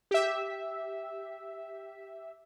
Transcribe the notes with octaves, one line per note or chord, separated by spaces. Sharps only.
G4 E5